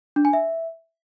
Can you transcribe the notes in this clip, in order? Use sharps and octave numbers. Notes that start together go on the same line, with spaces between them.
D4
G#5
E5